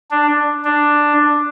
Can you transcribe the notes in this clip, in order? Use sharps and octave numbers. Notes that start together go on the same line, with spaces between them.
D4
D4